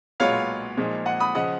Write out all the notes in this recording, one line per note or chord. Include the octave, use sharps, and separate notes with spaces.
B1 A#2 G#3 B3 F4 C#5 F5
A#2 F3 G#3 D#4
D#5 F#5
B5 D#6
C#3 F3 D#5 F#5